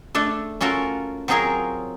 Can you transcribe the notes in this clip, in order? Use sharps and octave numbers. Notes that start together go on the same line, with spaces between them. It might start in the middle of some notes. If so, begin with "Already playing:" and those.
A3 D4 A4
C#4 F4 F#4 A4 A#4
F#3 C4 F4 G#4 A#4 C#5